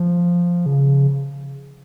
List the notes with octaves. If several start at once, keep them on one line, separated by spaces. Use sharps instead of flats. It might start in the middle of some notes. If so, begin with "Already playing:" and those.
Already playing: F3
C#3